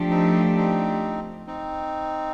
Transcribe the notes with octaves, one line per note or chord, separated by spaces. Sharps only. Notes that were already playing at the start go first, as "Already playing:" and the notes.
Already playing: F3 A3 D4 G4
C4 D#4
C4 D#4
C4 D#4